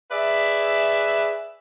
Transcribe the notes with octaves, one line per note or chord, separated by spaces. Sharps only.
G#4 B4 D5 E5